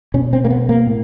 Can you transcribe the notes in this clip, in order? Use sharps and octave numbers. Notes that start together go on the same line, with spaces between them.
B2 C#4
C4
A#3
B3
A#3
A2